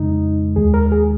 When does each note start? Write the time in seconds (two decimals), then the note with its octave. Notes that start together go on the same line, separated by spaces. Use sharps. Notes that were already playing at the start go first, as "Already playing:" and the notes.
Already playing: F2 C#3 G#3 D#4
0.56 D#2 D#3 G#3 G#4
0.74 A#4
0.92 G#4